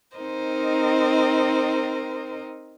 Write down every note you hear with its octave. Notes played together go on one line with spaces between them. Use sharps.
C4 D#4 A#4 C5 D#5